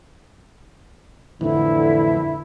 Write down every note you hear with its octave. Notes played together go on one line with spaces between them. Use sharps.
F2 A2 D3 E3 E4